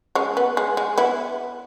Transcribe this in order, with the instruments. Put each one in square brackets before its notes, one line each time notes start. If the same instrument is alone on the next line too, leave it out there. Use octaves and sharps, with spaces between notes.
[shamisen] G#3 C#4
B3
G#3
G#3
B3 E4